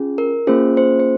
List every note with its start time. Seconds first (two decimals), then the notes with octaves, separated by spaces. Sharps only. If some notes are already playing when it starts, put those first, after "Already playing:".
Already playing: C#4 F4 G#4
0.18 A#4
0.47 A#3 C#4 F4 G#4 C5
0.77 C5
0.99 C5